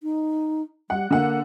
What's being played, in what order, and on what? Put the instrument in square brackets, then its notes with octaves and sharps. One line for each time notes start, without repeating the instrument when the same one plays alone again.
[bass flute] D#4
[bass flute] G3 [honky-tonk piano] F#5
[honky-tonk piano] D3 F#5 [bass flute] A#3